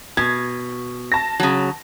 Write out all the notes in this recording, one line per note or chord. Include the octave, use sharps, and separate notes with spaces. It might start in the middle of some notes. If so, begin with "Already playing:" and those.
B2 G#6
A5 A#6
C#3 F#3